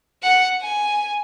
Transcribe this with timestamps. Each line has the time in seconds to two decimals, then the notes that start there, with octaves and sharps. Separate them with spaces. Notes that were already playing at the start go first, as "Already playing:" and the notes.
0.23 F#5
0.62 G#5